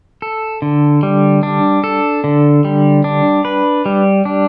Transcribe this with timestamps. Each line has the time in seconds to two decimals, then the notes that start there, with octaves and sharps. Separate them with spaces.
0.22 A4
0.62 D3
1.03 G3
1.43 D4
1.84 A4
2.24 D3
2.65 G3
3.04 D4
3.45 B4
3.86 G3
4.25 D4